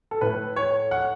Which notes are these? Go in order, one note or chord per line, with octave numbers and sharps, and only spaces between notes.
A4
A2 A3 B4
C#5
F#5